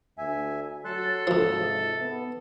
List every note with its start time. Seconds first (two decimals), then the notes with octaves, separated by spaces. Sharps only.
0.18 D2 E5 G#5
0.85 F#3 A4 C6 F#6
1.27 D2 G#2 C3 F3
2.00 B3